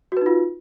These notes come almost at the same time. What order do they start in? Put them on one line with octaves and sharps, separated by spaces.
F#4 B4 D#4 F4